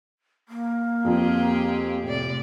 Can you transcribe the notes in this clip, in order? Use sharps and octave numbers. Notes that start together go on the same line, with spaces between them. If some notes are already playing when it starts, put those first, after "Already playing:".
A#3
F2 F3 C4 G4 G#4
A2 C3 D5